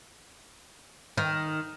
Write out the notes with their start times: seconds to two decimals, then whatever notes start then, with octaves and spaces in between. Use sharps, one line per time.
1.18 D#3